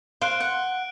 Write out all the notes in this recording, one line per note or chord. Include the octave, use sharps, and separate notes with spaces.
C5 F5 F#6 D7 G7
F#5